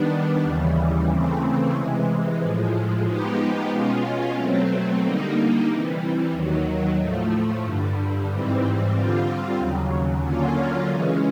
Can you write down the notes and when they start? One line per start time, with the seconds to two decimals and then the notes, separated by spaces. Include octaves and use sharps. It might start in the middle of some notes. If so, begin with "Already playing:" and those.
Already playing: D#3 G3 B3 D4
0.43 D#2 C#3 E3 G3
1.09 C#3 E3 A3 C4
1.74 C3 E3 G#3
2.40 A2 F3 G#3
3.05 F3 G#3 B3 D#4 G4
3.70 B2 G#3 C#4 F4
4.35 B2 F#3 A3 C4
5.01 D3 G3 A#3 D#4
5.66 C3 E3 G3
6.31 D#2 D#3 F#3
6.96 A2 F3 A3
7.62 G2 D3 G3
8.28 G#2 E3 G3 C4
8.93 D3 G3 C4 F4
9.57 D#2 C#3 F#3
10.22 D3 F#3 A#3 C#4 F4
10.88 C#3 E3 G#3 C#4